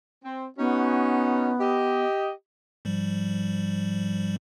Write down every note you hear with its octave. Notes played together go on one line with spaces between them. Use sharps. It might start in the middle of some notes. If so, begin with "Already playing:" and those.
C4
B3 C#4 D#4 F#4
G4 D#5
G#2 F3 G3